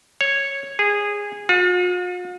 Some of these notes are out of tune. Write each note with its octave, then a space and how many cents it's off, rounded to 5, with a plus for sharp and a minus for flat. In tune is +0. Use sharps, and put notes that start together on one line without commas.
C#5 -5
G#4 -15
F4 +45